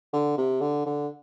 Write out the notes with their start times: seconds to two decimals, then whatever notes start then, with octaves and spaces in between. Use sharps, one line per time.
0.13 D3
0.38 C3
0.61 D3
0.86 D3